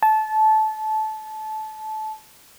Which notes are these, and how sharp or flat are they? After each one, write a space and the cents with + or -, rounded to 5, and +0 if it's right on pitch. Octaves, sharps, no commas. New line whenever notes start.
A5 -20